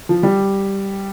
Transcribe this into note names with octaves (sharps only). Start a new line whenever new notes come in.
F3
G3